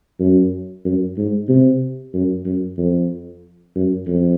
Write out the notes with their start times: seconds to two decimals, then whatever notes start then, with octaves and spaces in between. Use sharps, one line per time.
0.20 F#2
0.85 F#2
1.17 G#2
1.48 C3
2.14 F#2
2.45 F#2
2.77 F2
3.75 F#2
4.07 F2